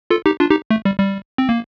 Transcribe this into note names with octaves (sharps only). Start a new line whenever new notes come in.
F4 A4
D#4 G4
D4 F4
D#4 G4
A3
G3
G3
C4
A#3